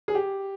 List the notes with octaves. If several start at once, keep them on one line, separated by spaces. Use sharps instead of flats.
G#4
G4